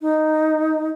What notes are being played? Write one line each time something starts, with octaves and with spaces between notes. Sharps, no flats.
D#4